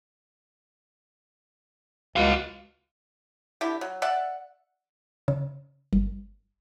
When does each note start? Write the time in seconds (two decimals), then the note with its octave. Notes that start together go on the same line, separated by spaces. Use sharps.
2.16 C#2 F#4 F5
3.61 D3 E4 G4
3.81 F#3
4.02 D5 E5 F#5
5.28 C#3
5.93 G1